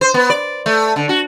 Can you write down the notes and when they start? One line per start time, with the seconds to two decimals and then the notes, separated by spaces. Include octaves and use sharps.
0.01 C5
0.14 B3
0.30 D5
0.66 A3
0.96 D3
1.09 F#4